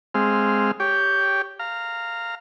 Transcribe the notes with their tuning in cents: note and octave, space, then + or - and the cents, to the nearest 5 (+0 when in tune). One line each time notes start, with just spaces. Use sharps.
G#3 +0 C4 +0 F5 -15
G4 +0 C#5 +15 G5 +0
F5 +0 A#5 -20